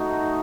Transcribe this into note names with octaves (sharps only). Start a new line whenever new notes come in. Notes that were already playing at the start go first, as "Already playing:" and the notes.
Already playing: A3 D#4 F#4